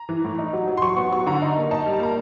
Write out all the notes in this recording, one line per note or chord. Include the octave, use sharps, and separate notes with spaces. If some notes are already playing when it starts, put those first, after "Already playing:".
Already playing: A#5
E3
A2
D#4
F#3
F#3
C6
F#3 C#6
B3 C#6
F#3 C#6
D3 A#5
D#4
A#3
D#4 A5
G3
A5
A#3 A#5